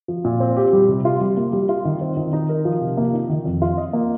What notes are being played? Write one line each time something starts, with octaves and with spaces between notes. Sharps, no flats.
F3
A#2
C4
G4
G3
C3
F4
G3
A#3
G3
F4
D#3
C4
D#3
D#4
A#4
F3
C3
A#3
D#4
D#3
F2
F4
D#5
A#3